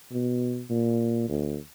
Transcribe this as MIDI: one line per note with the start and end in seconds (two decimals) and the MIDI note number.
0.12 0.63 47
0.70 1.27 46
1.29 1.57 38